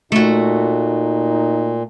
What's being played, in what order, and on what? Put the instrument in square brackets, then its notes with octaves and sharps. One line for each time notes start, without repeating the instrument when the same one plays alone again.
[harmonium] A#2 [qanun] A3 F#4 [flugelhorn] D#4